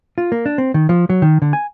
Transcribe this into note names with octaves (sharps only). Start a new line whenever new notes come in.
F4
A#3
D4
C4
D#3
F3
F#3
D#3
D3
G#5